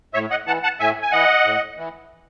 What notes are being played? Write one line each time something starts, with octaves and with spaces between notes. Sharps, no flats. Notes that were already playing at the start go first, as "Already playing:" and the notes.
A2 C#5 E5
D#5 F#5
E3 F#5 A5
F#5 A5
A2 E5 G#5
G#5
E3 D#5 F#5
A2
E3